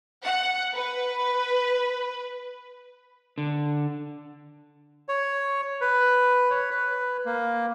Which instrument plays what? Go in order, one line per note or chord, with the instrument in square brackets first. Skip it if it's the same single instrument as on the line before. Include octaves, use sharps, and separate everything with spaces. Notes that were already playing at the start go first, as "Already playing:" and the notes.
[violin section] F#5
B4
[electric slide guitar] D3
[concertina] C#5
B4
C#5
B4
A#3